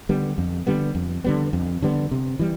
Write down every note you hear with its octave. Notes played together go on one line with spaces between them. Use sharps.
D3 G3 B3
F2
D3 G3 B3
F2
D3 G3 B3
F2
D3 G3 B3
C3
E3 G3